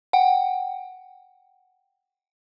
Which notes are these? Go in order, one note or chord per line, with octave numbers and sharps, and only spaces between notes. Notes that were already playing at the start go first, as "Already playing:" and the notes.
F#5 G5